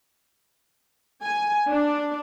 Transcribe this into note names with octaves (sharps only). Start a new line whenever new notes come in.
G#5
D4